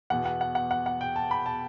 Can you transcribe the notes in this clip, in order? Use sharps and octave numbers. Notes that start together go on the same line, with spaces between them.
E2 B2 F#5
F#5
F#5
F#5
F#5
F#5
G5
A5
B5
A5